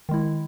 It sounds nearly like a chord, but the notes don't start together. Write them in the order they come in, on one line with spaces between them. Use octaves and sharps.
D#3 G#3 E4